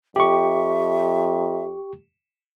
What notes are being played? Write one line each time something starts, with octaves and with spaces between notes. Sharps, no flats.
F2 G4 E5 C#6